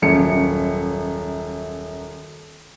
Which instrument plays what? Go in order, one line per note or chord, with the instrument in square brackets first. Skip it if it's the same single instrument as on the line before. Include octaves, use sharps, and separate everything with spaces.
[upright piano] D#1 F#2 C#7